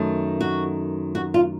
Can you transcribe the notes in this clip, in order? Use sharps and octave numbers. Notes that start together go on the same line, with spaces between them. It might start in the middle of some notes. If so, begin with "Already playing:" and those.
Already playing: F#2 D#3 A3
F#4
F#4
F4